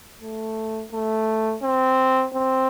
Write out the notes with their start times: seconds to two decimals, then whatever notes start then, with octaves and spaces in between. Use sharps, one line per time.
0.21 A3
0.92 A3
1.63 C4
2.34 C4